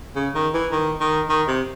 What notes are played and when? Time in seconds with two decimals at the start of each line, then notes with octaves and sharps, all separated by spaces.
0.16 C#3
0.35 D#3
0.54 E3
0.72 D#3
1.01 D#3
1.29 D#3
1.48 C3